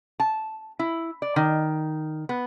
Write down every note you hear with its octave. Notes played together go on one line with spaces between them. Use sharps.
A5
E4
D5
D#3
B3